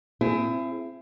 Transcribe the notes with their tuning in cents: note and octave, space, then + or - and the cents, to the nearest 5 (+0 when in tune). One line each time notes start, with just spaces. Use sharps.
C4 +0 E4 +30 G#4 +10